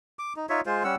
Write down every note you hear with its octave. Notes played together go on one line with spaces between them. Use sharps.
D6
D#4
D#4 F4 C#5 E5
G#3 F4 C5
G3 C#4 F#5 E6